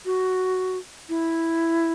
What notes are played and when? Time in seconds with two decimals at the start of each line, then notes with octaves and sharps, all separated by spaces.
0.05 F#4
1.09 E4